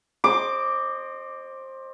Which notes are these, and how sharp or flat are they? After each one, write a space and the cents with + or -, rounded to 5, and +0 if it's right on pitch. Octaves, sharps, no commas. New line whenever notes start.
C5 +20 D#5 -25 D6 +0